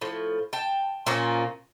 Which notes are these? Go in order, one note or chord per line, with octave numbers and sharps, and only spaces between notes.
A2 F3
G5 A5
A#2 F3 A#3 C#4